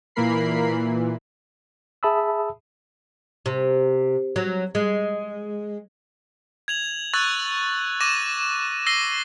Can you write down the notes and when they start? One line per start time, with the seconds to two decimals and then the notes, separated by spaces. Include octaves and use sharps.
0.15 A#2 E3 A#3 A#4 B5 C7
0.70 A#2 E3
2.03 G#4 E5 A5 B5 D#6 E6
3.46 C3
4.36 F#3
4.75 G#3
6.68 G#6 F7 F#7
7.14 C#6 E6 F#6 G#6 A6
8.01 C#6 D6 A#6 D#7 E7
8.86 E6 A#6 C7 D#7 G7